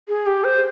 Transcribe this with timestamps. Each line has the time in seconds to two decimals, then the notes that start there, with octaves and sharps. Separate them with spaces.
0.09 G#4
0.26 G4
0.44 C5